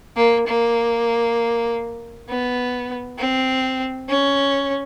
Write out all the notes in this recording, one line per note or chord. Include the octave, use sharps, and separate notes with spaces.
A#3
A#3
B3
C4
C#4